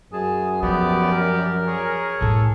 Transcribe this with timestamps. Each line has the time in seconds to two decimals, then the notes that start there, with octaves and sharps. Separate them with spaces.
0.13 F#2 G#4 A5
0.63 F3 B3 G4 D5
1.12 A#4
1.67 G#4 C#5
2.21 A2 A3 A4